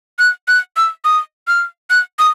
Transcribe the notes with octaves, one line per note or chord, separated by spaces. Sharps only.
F#6
F#6
E6
D#6
F6
F#6
D#6